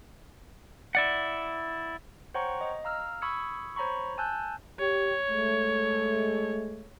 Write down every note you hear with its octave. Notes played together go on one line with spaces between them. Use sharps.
E4 D5 F#5
C5 C#5 F#5 G5 A#5 C#6
D#5
F5 A#5 E6 F6
B5 C#6 D#6 E6 G#6 C#7
C5 C#5 A#5 B5 C#6
G#5 A5 E6 F#6 G6
G4 C#5
G#3 A3